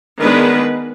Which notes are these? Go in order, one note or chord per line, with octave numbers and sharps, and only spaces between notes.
D#3 G#3 B3 D4 B4